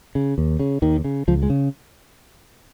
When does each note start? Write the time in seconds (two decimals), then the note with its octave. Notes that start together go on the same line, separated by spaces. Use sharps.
0.15 C#3
0.38 D#2
0.59 C#3
0.82 D#2 D#3
1.04 C#3
1.28 C#2 F3
1.43 G#3
1.50 C#3